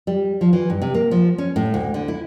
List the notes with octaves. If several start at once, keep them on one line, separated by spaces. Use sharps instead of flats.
G3
F3
E3
G2
C3
A#3
F3
C#4
A2
D2
D3
E4